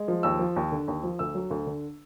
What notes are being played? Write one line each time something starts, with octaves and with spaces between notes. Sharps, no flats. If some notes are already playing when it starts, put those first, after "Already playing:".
Already playing: G#3
F3
D#2 E6
F3
D#2
D3
D#2
F3
D2 E6
F#3
D2
D3